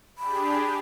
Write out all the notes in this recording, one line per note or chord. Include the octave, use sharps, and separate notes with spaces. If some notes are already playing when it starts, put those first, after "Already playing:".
D4 G4 G#4 B5